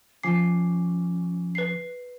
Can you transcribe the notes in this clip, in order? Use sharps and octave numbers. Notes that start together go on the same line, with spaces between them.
F3 C#4 G#5 D6 C7
B4 C7